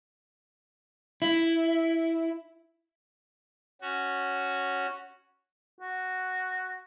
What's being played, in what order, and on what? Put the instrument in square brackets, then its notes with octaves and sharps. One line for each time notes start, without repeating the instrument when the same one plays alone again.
[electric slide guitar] E4
[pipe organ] C#4 F#4
[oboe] F#4